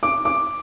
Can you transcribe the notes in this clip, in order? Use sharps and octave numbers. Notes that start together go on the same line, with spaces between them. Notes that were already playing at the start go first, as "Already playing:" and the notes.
D6
D6